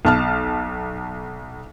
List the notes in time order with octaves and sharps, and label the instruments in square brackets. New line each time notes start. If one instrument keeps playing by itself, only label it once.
[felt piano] B1 A5 F6